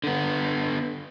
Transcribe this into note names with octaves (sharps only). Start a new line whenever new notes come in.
D3 B3